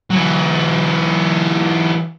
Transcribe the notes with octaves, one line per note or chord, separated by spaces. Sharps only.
E3 F#3